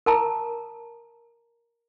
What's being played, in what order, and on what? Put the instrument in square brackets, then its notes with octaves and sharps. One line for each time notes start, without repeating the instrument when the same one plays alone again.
[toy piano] A#4 A5 A#5